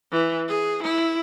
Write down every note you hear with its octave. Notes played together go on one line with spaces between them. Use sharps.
E3
G#4
E4